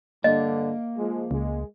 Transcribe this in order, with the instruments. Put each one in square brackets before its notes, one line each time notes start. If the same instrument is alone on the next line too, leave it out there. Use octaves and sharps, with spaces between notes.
[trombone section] G2 D3 [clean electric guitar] A#3 [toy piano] D#5
[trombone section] F3 G#3
[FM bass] C#2 [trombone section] G#3